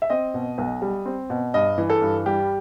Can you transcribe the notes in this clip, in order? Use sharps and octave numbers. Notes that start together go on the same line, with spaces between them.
E5
C4 D#5
B2
B1
G3
C4
B2
G2 D#5
E3
A4
G2
G3 G4